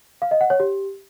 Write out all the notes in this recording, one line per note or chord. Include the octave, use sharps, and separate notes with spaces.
F5
D#5
F#5
C#5
G4